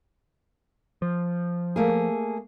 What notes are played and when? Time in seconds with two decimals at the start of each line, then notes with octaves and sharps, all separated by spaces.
1.02 F3
1.76 A3 A#3 G#4